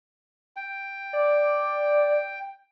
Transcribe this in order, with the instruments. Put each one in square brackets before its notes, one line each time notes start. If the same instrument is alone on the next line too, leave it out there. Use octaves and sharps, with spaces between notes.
[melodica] G5
[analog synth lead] D5